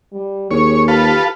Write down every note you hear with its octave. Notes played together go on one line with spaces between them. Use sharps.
G3
D#2 G#4 C#5
F4 G4 A4 B4